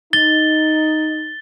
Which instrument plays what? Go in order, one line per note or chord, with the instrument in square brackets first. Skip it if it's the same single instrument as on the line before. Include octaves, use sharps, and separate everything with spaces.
[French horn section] D#4 [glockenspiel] A6 G7